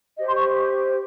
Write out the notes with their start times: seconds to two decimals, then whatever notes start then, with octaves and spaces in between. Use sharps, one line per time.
0.17 G4 C5 D#5
0.26 C6
0.36 C#6